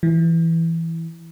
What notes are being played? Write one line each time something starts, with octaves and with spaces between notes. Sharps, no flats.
E3